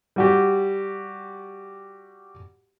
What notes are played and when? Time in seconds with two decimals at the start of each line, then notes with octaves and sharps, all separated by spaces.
0.16 G3 F#4 G4